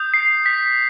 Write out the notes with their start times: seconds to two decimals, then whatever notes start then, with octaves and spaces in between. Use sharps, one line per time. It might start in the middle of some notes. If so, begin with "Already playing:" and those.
Already playing: D#6 G6
0.14 C7
0.46 B6